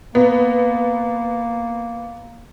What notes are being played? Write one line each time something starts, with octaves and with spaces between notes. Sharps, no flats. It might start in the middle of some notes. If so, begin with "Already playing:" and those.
A#3 B3